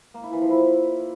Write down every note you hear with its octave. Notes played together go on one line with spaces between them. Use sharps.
A#3
E4
E3
F3
E4